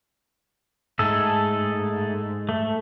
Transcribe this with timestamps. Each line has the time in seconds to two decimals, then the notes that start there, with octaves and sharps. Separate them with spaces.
0.99 G#2 A3 G#4 A4
2.49 A3